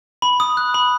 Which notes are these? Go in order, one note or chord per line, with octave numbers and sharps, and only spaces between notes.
B5
D#6
F#6
B5